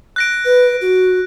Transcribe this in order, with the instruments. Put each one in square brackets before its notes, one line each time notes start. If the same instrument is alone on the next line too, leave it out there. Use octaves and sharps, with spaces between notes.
[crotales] F#6 A#6 D7
[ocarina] B4
F#4